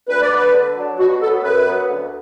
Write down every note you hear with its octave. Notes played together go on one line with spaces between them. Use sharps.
D2 B4
D5
D3 B3 B4
D3
F#3 D4
B2 F#4
F#3 B3 A4
F#2 B4
F#3 B3
D2